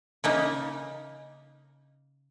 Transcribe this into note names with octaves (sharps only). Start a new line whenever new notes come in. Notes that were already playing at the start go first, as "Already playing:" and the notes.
C#3 A#3 D#4